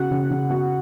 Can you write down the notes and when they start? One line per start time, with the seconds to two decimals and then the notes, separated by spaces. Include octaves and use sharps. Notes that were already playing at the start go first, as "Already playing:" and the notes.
Already playing: C#3 F#4 F#5
0.11 C#3
0.30 C#3
0.50 F#4